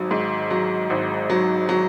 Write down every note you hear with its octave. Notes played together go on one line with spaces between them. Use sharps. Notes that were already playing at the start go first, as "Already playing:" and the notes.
Already playing: G#1 F#3
G#2
F#3
G#1
F#3
F#3